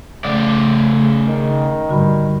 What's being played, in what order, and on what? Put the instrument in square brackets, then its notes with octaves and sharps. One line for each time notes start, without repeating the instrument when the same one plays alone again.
[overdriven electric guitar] C#3 D5 [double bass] A3
[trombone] D#3
[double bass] G2 [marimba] D3 F#4 B5